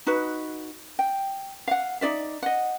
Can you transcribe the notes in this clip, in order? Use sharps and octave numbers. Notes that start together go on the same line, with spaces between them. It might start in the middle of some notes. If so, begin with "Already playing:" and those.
D#4 F#4 B4
G5
F5 F#5
D#4 G#4 D5 E5
D#5 F#5